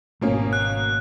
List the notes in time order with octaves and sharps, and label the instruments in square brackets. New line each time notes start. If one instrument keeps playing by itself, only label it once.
[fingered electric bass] G#1 A3 [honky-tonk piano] B2 A#3 C#4
[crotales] F#6